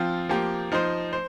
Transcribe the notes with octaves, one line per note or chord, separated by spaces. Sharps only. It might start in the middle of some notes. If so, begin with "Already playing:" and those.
Already playing: F3 C4 F4
F3 A#3 G4
F3 D#4 C5
C5